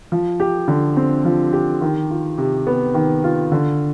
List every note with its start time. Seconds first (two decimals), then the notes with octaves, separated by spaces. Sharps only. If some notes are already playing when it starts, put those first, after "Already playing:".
0.12 F3
0.40 G4
0.68 D3
0.97 C4
1.25 F3
1.53 G4
1.81 D#3
2.11 F4
2.38 C3
2.67 B3
2.94 D#3
3.24 F4
3.52 D3